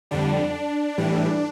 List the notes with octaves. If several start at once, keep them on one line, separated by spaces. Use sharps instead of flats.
F2 D3 G3 D4
A2 E3 G3